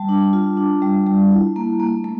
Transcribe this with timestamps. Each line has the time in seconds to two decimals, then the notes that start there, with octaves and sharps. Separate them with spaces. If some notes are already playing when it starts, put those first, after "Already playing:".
Already playing: G3 A5
0.09 D4
0.33 F4
0.57 D4
0.82 G3
1.07 G3
1.31 E4
1.56 A#3
1.80 A#3
2.04 A3